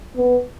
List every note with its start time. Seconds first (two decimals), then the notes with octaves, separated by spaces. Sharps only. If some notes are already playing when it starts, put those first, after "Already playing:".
0.17 B3